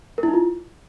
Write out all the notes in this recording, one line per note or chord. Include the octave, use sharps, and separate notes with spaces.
A#4
E4
D#4
F4